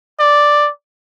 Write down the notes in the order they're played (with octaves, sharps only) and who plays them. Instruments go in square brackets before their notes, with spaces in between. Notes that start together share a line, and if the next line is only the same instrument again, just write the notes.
[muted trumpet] D5